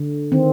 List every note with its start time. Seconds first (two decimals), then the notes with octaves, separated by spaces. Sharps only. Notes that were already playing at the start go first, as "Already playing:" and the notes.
Already playing: D3
0.32 D#3 C4